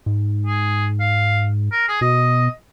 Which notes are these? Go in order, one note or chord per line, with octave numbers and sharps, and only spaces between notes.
G#2
G#4
F5
A#4
G#4
B2 D#5